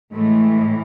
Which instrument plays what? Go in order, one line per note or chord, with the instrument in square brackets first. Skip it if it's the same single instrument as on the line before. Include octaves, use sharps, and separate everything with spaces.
[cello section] A2 E3 G#3 A3